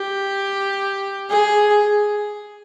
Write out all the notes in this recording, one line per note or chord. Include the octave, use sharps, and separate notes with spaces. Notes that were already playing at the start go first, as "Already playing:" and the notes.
Already playing: G4
G#4